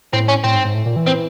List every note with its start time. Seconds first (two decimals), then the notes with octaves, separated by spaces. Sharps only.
0.13 A2 C4
0.28 C#4
0.44 A2 C4
0.54 G#2
0.65 G#2
0.75 A2
0.86 A#2
0.96 E3
1.07 C4